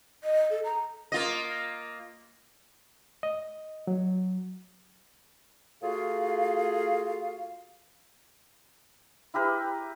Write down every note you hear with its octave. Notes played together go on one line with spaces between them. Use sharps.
D#5
A4
A#5
A#3 F4 D#5
D#5
F#3
A3 F4 F#4 G#4 F5
E4 G4 A#4 B4